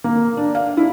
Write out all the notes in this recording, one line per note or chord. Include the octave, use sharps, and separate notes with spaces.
A#3
D4
F5
E4